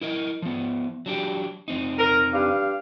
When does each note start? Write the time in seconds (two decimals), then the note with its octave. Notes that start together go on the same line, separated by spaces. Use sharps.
0.01 E4 A#4 D#5
0.42 F3 B3
1.06 F#3 D4 G4
1.68 F2 C4 D#4
1.99 A#4
2.34 G2 D4 F5